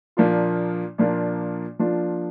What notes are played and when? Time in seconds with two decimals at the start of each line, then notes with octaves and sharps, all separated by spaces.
0.17 A#2 F3 A#3 D4 F4
0.98 A#2 F3 A#3 D4 F4
1.79 F3 A#3 D4 F4